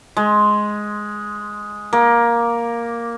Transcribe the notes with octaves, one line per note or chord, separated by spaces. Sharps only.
G#3
A#3